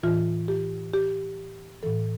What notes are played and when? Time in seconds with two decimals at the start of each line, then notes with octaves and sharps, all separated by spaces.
0.03 A2 E3 F4
0.48 G4
0.94 G4
1.83 A2 E3 A4